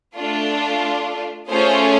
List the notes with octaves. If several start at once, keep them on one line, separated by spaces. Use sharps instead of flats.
A3 D4 F4
A3 C#4 F4 G#4 C5